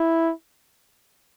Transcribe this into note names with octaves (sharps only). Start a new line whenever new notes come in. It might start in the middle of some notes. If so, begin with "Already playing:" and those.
Already playing: E4